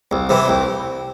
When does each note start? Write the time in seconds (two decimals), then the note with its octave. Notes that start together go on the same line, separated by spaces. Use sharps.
0.11 C2
0.29 C3 E3
0.48 C2